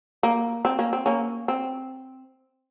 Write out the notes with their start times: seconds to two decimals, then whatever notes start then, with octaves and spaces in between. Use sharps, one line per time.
0.23 A#3
0.65 C4
0.79 A#3 C#4
0.93 C4
1.06 A#3 C#4
1.48 C4